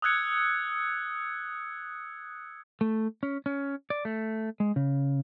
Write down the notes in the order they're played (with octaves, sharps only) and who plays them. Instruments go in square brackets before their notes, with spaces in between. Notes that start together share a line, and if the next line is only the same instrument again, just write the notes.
[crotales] D#6 E6 F#6 G#6 C#7
[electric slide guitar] A3
C#4
C#4
D5
A3
G#3
C#3